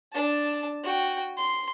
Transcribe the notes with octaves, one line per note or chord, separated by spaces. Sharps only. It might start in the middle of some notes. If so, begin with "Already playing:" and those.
D4 A5
F#4 G5
C6